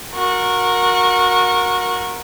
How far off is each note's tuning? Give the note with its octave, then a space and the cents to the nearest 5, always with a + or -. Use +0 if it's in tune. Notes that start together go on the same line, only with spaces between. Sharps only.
F#4 -25 A#4 +0